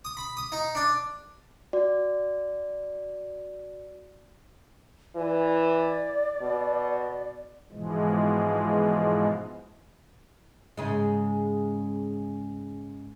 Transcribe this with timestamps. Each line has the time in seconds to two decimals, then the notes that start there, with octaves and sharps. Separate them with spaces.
0.05 D#6
0.17 B5
0.37 D#6
0.52 D#4
0.75 D4
1.73 F#4 D5
5.16 E3 D5
6.42 B2
7.72 G#2 B2 E3 F3 G#3
10.77 G#2 C#3 G#3